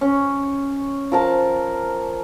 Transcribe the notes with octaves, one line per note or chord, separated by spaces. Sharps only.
C#4
F3 A#4 A5